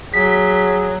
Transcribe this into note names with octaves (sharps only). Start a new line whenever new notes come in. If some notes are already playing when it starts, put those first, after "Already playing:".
F#3 G#4 B6